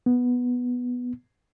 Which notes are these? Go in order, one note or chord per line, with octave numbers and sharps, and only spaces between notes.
B3